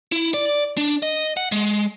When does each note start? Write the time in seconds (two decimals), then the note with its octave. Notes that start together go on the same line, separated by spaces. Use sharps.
0.12 E4
0.34 D5
0.77 D4
1.03 D#5
1.37 F#5
1.52 G#3